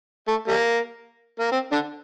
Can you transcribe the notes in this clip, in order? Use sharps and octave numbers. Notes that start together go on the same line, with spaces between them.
A3
G3 A#3
A#3
C4
D3 D4